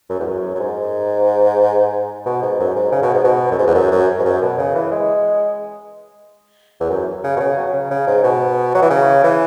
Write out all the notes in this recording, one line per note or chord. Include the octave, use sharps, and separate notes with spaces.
F#2
E2
F#2
F#2
G#2
B2
G#2
F#2
G#2
C#3
B2
G#2
B2
F#2
G#2
E2
F#2
F#2
G#2
F#2
B2
C#3
E3
G#3
E2
F#2
C#3
B2
C#3
F#3
C#3
C#3
G#2
B2
F#3
E3
C#3
E3